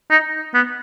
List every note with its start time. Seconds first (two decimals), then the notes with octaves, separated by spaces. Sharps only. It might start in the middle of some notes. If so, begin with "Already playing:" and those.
0.11 D#4
0.54 B3